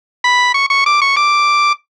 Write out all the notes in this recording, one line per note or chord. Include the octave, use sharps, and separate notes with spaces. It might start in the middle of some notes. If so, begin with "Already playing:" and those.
B5
C#6
C#6
D6
C#6
D6